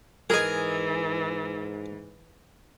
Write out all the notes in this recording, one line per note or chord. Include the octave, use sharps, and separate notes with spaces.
G#2 E3 G#4 A#4 D#5 G#5